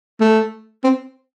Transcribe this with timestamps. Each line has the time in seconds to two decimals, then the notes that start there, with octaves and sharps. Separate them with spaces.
0.20 A3
0.84 C4